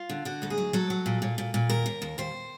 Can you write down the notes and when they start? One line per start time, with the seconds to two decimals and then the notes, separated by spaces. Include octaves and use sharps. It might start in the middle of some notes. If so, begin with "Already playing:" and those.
Already playing: F4
0.09 D3
0.25 D3 F#4
0.42 D2 A4
0.50 G#4
0.58 F#3
0.73 F#3 A4
0.90 F#3
1.06 A#2
1.22 A#2
1.38 A#2
1.54 A#2
1.69 D#2 A#4
1.86 D#2
2.02 D#2
2.18 D#2 C5